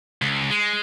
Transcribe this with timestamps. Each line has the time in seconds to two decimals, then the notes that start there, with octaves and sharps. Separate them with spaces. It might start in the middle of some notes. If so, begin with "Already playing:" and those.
0.22 C#2
0.50 G#3